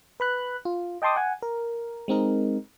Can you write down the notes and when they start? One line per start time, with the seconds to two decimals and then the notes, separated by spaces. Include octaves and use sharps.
0.20 B4 B5 F#6
0.65 F4
1.02 D#5 G5 A5 C6 D6 D#6
1.16 F#5 G#5
1.42 A#4
2.08 G#3 C4 D#4 A#4